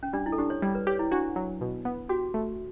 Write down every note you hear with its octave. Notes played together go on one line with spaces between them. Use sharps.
C#4
G3 D4
E4
A4
D4 G4
C#5
G3 D5
B4
G4 C#5
E4
D4 F#4
F#3
B2
B3
F#4 G4
A3